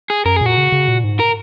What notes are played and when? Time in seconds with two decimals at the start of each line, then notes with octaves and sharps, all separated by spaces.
0.10 G#4
0.25 F#2 A#4
0.36 G#4
0.41 A#2 F#4
0.57 C#3
0.72 C#3
0.88 A#2
1.04 G#2
1.20 A#4